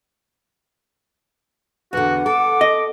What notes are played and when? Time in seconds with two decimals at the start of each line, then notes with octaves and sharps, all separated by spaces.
1.93 E2 D3 F#4 F#5
2.26 A4 D6
2.61 D#5